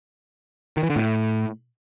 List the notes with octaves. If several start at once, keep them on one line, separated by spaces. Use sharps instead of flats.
D#3
E3
D3
A2